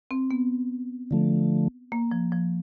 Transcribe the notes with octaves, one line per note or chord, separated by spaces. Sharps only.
C4
B3
D3 F3 A3
A#3
F3
F3